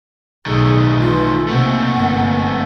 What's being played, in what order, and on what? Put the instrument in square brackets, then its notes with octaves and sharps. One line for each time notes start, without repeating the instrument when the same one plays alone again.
[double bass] B1 A2 [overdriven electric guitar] D#3 A3 [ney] G#4
[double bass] E3 [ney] F4
[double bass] C3 A#3 [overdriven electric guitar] A3 C4 [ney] F#5
[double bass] G1 A#3